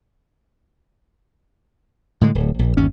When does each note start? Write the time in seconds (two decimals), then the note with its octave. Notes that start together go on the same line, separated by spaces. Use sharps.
2.21 A2 D3 G#3
2.35 D1
2.59 A#1
2.77 G1 D#2 C#4